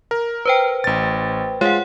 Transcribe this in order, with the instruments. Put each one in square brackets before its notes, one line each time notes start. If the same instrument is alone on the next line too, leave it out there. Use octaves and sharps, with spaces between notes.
[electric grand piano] A#4
[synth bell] B4 C5 G5
[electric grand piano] A1 A6
[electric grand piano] G#3 F4 [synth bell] C#5 F#5